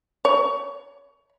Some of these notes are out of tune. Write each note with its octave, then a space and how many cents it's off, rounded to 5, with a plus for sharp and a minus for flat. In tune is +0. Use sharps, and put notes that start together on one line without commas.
C#5 +25